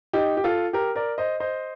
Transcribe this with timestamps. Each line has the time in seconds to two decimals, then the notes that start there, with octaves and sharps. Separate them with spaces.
0.13 D#4 G4
0.37 G4
0.44 F4 A4
0.73 G4 A#4
0.96 A#4 D5
1.18 C5 D#5
1.40 C5 D#5